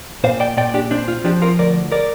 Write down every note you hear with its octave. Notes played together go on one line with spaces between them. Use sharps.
A#2 C5 F5
D5 G5
A#2 D5 G5
D4 G4
C4 D4
F4
F3 D4 G4
F4 A#4
D2 A#4 D5
A#4 D5